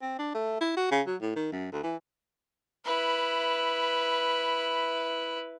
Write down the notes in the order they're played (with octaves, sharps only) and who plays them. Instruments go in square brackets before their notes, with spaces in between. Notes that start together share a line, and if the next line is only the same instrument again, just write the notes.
[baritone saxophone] C4
D4
A3
E4
F#4
C#3
F#3
A2
D#3
F#2
D2
E3
[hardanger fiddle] E4 B4